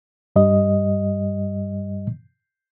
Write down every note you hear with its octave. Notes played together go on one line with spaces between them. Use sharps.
G2 G3 D#5